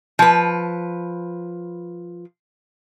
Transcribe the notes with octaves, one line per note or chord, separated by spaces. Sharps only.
F3 B4